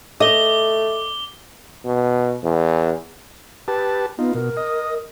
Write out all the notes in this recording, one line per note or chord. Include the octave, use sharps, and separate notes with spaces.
A3 D#5 D6 G7
B2
E2
G4 B4 A5
B3 D#4 F4
B2 A#4
D#5